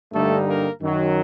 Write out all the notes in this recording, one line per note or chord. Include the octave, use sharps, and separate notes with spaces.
G2 D3 G3 A3 A#3 D#4 A4
A#3 A#4
F#2 D#3 F#3